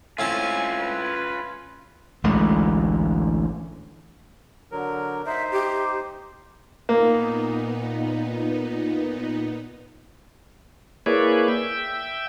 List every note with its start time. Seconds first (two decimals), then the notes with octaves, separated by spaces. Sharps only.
0.19 A2 C4 C#4 F4 G#5 A5
0.81 B4
2.24 A1 D2 G#3 A3
4.72 D3 F#3 A#4
5.26 D#4 C5 E5
5.52 G4
6.89 A#2 A#3 B3 D#4
11.06 A#3 E4 G#4 B4 C#5 D5
11.48 E5 G5